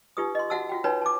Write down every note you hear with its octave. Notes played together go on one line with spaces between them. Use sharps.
D#4 F4 G4 B4 D#6
D#5 C6
F#4 E5 F#5 A5 E6
F4 F#4 G5
D#4 B4 C#5 G5 A5 B5
A5 D6